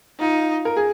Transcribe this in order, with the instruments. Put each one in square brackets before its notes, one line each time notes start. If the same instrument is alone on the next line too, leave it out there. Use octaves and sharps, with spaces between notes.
[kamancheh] D#4 [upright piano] F4
[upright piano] A#4
G#4